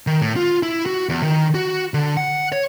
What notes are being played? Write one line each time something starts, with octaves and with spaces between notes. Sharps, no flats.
D#3
A2
F4
E4
F#4
E2
D#3
F#4
D3
F#5
C#5